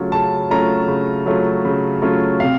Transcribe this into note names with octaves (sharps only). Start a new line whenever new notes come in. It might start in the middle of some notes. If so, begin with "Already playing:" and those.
Already playing: C#3 F#3 A3 C#4 F4
C#3 A5
F#3 A3 C#4 F4 A#5
C#3
F#3 A3 C#4 F4
C#3
F#3 A3 C#4 F4
C3 F5